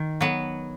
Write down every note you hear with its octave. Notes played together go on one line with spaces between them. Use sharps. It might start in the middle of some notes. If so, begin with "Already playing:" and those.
Already playing: D#3
F#3 B3